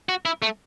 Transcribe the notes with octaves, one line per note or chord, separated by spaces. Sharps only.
F#4
E4
A3